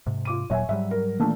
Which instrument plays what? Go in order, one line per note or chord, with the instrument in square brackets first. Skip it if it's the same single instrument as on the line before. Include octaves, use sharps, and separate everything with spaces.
[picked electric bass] G#2 C3
[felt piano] F4 D6 D#7
[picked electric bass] D#1 A#2 F#3 [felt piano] C#5 E5 G#5
[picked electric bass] G#2 F#3 G3 [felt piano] E5
[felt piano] A#4
[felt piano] A#2 A3 D4 [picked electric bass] D#3 E3 A#3